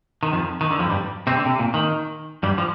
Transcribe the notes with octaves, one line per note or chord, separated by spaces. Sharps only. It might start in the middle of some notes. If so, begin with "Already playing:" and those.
D#3
F2 F3
D#3
D3
F2 F3
G2 G3
C3 C4
D3
C3
A#2
D#3
G2 G3
F3